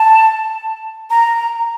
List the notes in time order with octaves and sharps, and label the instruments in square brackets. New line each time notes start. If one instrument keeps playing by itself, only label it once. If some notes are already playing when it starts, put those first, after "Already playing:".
Already playing: [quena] A5
A#5